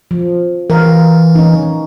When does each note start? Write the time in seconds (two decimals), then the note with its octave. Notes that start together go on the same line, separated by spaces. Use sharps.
0.11 F3
0.70 E3 A#4 F5
1.35 C#4 D#4